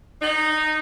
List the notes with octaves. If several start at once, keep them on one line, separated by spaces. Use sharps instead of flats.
D#4